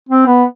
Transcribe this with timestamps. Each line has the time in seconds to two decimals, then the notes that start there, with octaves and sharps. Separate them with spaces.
0.09 C4
0.26 B3